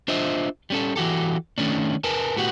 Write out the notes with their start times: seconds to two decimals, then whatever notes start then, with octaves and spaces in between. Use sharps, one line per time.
0.08 D4 F4 C5 D#5 E5
0.70 G3 C#4 A4
0.96 E3 F#4 G4 A4
1.58 D#3 A3 C#4 D4
2.04 A#4 B4 G#5 A5
2.37 A2 B3 F#4 G4 F#5